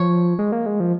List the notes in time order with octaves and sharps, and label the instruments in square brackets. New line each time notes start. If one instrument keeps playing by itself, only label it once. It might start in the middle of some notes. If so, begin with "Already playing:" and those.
Already playing: [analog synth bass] F3 [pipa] C#5
[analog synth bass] G#3
A#3
G#3
F3